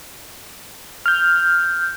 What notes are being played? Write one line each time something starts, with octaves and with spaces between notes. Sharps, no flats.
F6 G6